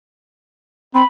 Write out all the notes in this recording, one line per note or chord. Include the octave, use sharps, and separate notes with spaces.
C4 B5